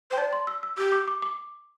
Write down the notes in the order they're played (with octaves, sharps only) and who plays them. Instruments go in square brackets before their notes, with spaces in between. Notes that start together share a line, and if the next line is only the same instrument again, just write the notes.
[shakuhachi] C5 [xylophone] G5
[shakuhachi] D5 [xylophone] A5
[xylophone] C6
E6
E6
[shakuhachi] G4 [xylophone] E6
[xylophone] D6
D6
D6